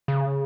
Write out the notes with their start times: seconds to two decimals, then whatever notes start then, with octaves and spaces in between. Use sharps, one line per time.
0.08 C#3